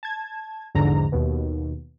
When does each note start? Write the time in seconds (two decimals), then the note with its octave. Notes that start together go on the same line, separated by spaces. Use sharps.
0.03 A5 G#6
0.75 A#1 E2 G#2 D3 A#5
1.12 D#2 B2